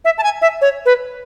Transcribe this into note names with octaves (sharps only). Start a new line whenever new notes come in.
E5
A5
G#5
E5
C#5
B4